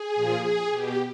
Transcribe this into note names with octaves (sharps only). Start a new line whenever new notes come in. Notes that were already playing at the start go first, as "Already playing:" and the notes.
Already playing: G#4
A#2 F3
G#4
B2 G4